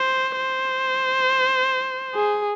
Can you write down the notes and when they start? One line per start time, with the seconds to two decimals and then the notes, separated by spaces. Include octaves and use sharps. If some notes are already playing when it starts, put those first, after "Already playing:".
Already playing: C5
0.37 C5
2.14 G#4